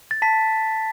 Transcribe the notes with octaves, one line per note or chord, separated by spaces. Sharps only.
A6
A5 B6